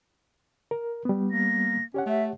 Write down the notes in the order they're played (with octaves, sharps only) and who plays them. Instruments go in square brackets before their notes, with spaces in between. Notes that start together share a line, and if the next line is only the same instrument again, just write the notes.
[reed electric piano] A#4
G3 B3
[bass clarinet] A#3 [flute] A#6
[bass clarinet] C#4 [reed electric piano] G4 C#5 F#5
[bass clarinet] A3 [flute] E5